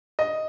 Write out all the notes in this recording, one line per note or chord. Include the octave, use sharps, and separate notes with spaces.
D#5